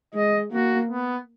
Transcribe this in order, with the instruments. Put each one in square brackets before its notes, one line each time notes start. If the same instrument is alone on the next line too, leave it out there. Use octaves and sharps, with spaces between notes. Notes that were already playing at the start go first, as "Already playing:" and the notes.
[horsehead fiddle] G#3 [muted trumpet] D#5
[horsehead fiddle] A#3 [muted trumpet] F#4
[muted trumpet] B3